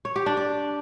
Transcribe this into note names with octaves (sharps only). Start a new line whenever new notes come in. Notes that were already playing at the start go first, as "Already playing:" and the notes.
C#5
G4
D4
D5